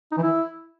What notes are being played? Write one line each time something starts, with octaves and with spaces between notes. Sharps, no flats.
D#4
E3
E4